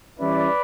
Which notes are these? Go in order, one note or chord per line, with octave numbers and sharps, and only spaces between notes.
E3 G3 C#4 E4 B4 D5